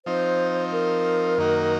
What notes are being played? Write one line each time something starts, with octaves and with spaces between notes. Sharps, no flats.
F3 C4 D#4 C5
A#4
F#2 D#3 A#3 D#4 F#4